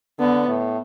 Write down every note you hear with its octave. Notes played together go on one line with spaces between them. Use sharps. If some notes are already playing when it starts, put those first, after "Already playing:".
D3 B3
A2